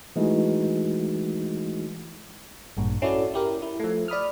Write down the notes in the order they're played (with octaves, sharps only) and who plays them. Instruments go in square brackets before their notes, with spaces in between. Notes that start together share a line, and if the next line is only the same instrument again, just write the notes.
[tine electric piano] E3 G#3 A3 D#4 E4 F#4
[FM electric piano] A1 G2 A#2
C#4 E4 F#4 A4 D5
E4 G4 A#4
E4
F3 A3
D5 B5 D#6 F6